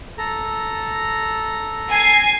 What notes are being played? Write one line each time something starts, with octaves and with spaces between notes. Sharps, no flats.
A4 A#5
G#5 C7